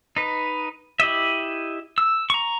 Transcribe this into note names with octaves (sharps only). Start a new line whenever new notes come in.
D#4 B4
E4 G4 D#5 E5
E6
A#5 C#6